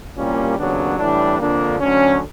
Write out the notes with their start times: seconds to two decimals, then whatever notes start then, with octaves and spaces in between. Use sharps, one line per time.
0.17 C2 A#2 G3 A#3 C#4
0.58 D#2 C#3 F#3 B3 D4
0.99 A2 E3 G3 D4
1.40 F2 D3 F3 A#3 D4
1.80 D2 D3 F#3 C#4